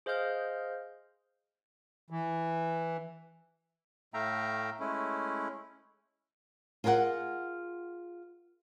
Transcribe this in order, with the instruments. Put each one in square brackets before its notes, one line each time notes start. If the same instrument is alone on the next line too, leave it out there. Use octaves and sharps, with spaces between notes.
[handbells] G#4 C5 D#5 F5 F6 G6
[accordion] E3
[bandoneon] A2 A3 E5 F5 G5 A#5
G#3 A3 C#4 E4
[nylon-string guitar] F4 G#4 A#4 D5 F#5